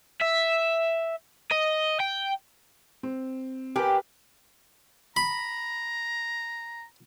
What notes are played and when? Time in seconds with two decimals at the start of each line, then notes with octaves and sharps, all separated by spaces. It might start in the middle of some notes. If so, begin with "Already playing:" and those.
0.21 E5
1.51 D#5
2.00 G5
3.03 C4
3.76 G4 A#4 B4 G5 G#5
5.17 A#5 B5